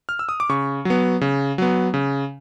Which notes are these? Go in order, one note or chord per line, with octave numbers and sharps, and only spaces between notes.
F6
E6
D#6
D6
C#3 C#6
F#3 B3
C#3
F#3 B3
C#3